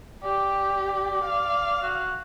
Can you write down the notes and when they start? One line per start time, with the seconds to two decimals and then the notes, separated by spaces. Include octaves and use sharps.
0.23 G4 D5
1.24 F5
1.82 F#4